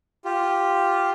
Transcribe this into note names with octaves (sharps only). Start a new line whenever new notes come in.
F4 G4